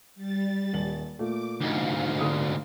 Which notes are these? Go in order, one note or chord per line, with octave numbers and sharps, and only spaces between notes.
G3 A6
D#1 F#7
A#2 A3 D6
D2 G#2 F5
D3 D#6